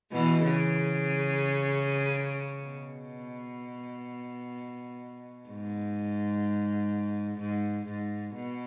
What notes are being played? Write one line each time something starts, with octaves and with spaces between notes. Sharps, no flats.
B2 E3
C#3
B2
G#2
G#2
G#2
B2